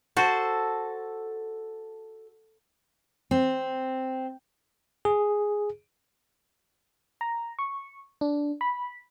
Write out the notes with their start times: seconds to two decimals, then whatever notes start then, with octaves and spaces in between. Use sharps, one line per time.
0.17 F#4 A4 C5
3.31 C4
5.05 G#4
7.21 A#5
7.59 C#6
8.21 D4
8.61 B5